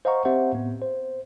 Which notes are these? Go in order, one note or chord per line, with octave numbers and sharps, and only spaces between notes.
C5 D#5 F5 F#5 A#5 C#6
C4 G4 C5 E5 F#5
A2 B3
C5